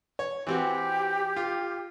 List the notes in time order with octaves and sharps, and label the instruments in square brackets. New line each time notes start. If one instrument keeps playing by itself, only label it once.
[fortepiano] C#5
[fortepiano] E3 C4 F#4 [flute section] G4
[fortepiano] F4